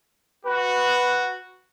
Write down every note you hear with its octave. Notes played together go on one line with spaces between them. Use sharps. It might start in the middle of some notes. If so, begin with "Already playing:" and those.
F#4 B4